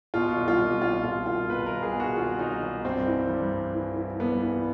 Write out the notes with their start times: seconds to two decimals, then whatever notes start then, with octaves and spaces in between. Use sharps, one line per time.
0.14 B2 F4
0.37 C2
0.48 F4
0.59 C2
0.81 C2 F4
1.04 B2 F4
1.26 C2 F4
1.49 B2 B4
1.66 A#4
1.72 C2
1.82 G#4
1.95 B2
2.00 F#4
2.16 C2 F4
2.39 C2 D#4
2.62 C2
2.84 G2 C4
3.07 E3
3.30 G2
3.52 G2
3.74 E3
3.96 E3
4.20 G2 B3
4.41 E3